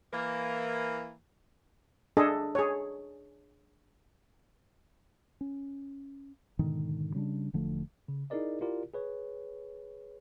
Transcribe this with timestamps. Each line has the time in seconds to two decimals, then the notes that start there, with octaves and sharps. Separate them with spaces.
0.13 E3 A#3
2.17 D4 G#4 A4 D#5
2.55 G#4 C#5
5.41 C#4
6.59 G#2 B2 D3 D#3
7.15 C#3 G3 C#4 D4
7.53 E1 D3 F3 A3
8.08 C#3
8.30 D#4 E4 G#4 A#4 D5 D#5
8.61 E4 F4 G4 A#4 D5
8.94 G#4 B4 C#5